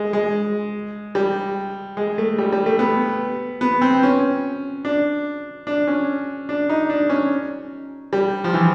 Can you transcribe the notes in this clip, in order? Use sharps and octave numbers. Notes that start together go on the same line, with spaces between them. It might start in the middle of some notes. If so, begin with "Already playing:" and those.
Already playing: G#3
G#3
G3
G#3
A3
G3
G3
A3
B3
B3
C4
C#4
D4
D4
C#4
D4
D#4
D4
C#4
G3
F3
E3